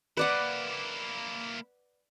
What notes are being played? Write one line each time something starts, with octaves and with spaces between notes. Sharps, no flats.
A#3 E4 B4 D5 F#5